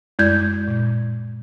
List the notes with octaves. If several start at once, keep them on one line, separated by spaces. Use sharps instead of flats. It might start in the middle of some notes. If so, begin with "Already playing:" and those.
F#2 G#3 E4 D5 G6 G#6
A#2